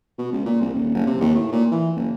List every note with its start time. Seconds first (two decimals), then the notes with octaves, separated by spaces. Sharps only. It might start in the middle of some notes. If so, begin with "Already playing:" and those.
0.18 B2
0.32 C#2
0.46 A#2
0.61 C2
0.74 D#1
0.94 F#1
1.07 C3
1.21 D#2
1.35 A2
1.52 A#2
1.71 E3
1.96 F#1